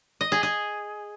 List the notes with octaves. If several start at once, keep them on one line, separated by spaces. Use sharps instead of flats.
D#5
G#4
G#4